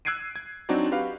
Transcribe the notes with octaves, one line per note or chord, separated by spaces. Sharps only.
E6 F#6 G#6 C7 D7 D#7
G#6
F#3 C4 D4 D#4 F#4 D5
F#4 G4 B4 F5